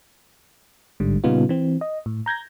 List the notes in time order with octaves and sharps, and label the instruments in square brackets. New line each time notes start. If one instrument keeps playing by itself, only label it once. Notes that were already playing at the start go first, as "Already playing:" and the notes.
[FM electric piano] A1 G#2 D3 G3
A#2 C#3 G3 B3 D#4 F4
E3 C4
D#5
A2
A#5 G6 G#6 A#6